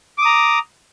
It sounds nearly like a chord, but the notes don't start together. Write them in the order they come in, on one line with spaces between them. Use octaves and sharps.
D6 D#6 A#5